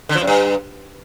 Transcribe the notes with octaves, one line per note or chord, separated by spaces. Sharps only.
D3
F3
F#2
G2